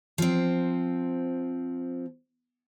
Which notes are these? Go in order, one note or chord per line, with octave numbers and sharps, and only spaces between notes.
F3 C4